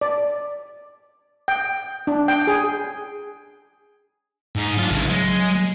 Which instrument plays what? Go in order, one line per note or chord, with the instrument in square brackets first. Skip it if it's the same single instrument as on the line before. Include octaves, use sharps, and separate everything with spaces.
[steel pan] D5
G5
D4
G5
G#4
[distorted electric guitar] G#2 D#4
[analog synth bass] F#3 [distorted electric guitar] D4 F4
[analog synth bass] A1 [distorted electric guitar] C#3 E3
[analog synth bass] F#3 [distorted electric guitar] G#3